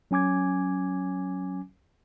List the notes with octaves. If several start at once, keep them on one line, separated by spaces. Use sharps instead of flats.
F#3 C#4 G#5 D6 G#6